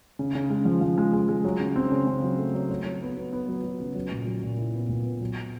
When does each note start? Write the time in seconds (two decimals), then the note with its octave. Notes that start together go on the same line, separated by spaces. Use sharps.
0.19 C#3
0.35 C#3
0.50 G#3
0.65 F3
0.81 F3
0.98 G#3
1.13 G#3
1.29 G#3
1.44 F#3
1.60 C#3
1.76 C4
1.92 C#3
2.07 C#3
2.23 F#3
2.39 A3
2.54 F#3
2.70 F#3
2.86 F#3
3.02 B3
3.17 B3
3.33 B3
3.48 F#3
3.64 F#3
3.80 C#3
3.95 F#3
4.11 A#2
4.27 F#3
4.43 A#2
4.58 E4
4.74 B3
4.89 A#2
5.05 B3
5.21 F#3